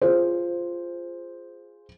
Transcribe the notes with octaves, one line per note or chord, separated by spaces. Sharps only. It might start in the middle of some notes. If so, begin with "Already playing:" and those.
F4 G#4 C5